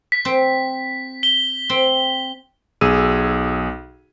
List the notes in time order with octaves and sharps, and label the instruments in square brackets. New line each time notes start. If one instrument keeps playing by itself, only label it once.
[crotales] B6
[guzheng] C4
[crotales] G7
[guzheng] C4
[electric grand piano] B1 G#4 E6 D#7